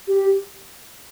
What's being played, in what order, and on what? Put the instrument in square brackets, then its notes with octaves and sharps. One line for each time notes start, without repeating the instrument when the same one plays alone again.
[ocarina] G4